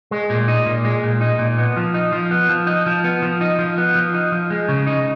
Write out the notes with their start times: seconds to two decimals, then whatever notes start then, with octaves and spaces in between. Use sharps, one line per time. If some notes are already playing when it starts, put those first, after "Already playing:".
0.11 G#3
0.30 A#2
0.48 D#4
0.66 A#2
0.85 G#3
1.03 A#2
1.21 D#4
1.39 A#2
1.58 B3
1.77 F3
1.94 D#4
2.12 F3
2.31 B3
2.49 F3
2.67 D#4
2.86 F3
3.04 B3
3.23 F3
3.41 D#4
3.59 F3
3.78 B3
3.95 F3
4.14 D#4
4.32 F3
4.50 G#3
4.68 C#3
4.87 D#4